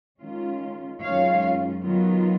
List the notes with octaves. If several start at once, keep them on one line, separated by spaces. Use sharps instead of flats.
D#3 G#3 C#4 F4
F#2 D#3 G#3 C#4 F4 C#5 F5
D#3 F#3 B3 F4